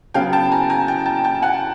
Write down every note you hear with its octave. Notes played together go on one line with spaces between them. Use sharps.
C#3 F#3 B3 F5 G5
G5 A5
G#5 A#5
G#5 A#5
G5 A5
G5 A5
G5 A5
F#5 G#5